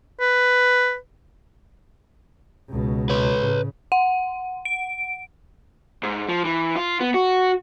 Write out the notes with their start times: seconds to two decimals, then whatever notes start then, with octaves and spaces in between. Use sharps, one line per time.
0.20 B4
2.69 C#2 B2
3.10 B4 C#5
3.40 A2 C#3
3.92 F#5
4.65 D7
6.03 G#2
6.29 F3
6.45 E3
6.76 F4
7.00 B3
7.14 F#4